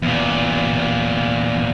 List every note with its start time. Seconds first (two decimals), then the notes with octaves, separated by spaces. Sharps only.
0.02 E2 A#2